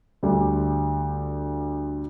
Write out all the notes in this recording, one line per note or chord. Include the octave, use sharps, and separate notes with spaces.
D2 D3 G3